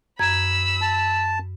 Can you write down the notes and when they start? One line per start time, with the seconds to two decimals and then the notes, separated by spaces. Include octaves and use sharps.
0.19 F#2 A#5 B5 E6 G#6
0.81 A5